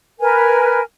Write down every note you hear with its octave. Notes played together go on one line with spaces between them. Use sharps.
A#4 B4 G#5